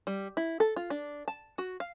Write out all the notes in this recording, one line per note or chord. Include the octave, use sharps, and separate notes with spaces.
G3
E4
A4
F4
D4
A5
F#4
F5